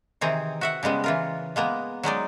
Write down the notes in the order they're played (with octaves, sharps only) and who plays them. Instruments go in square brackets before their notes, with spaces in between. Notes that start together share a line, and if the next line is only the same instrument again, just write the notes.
[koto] C3 D#3 E3 C4 G#4 A#5
F#4 E5 F#5
C#3 G3 G#3 B3
E3 F4 A#4
G#3 A#3 B3 A#5
F#3 G#3 D#4 D5